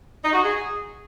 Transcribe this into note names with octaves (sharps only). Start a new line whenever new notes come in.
D#4
F#4
G#4